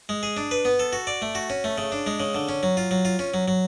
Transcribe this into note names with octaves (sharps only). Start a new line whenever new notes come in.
G#3
G#4
D4
B4
B3
A4
F#4
D5
A3
F#4
C#4
A3
C#3
D4
G#3
C#3
D3
C#4
F#3
F4
F#3
F4
C#4
F#3
F#3